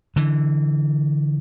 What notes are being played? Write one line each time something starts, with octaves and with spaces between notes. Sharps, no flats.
D3 E3